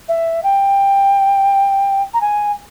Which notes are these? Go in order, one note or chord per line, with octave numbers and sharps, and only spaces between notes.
E5
G5
A#5
G#5